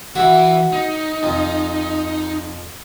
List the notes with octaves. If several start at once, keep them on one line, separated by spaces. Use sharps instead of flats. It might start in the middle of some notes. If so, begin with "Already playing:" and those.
E3 F#4 E5
D#4
F2